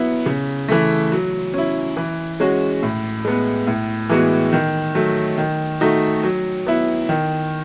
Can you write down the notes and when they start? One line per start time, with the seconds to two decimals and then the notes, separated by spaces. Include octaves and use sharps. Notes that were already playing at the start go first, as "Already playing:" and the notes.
Already playing: F#3 B3 E4
0.26 C#3
0.69 E3 A3
1.12 F#3
1.54 C#4 E4
1.97 E3
2.40 G#3 C#4 F#4
2.83 A2
3.25 G#3 B3
3.67 A2
4.10 E3 G#3 B3 F#4
4.53 D#3
4.95 F#3 A3
5.38 D#3
5.81 A3 D#4 F#4
6.23 F#3
6.66 B3 E4
7.09 D#3